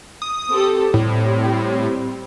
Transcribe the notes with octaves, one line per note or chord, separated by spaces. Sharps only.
D#6
C4 G4 A4
A2 G3 C4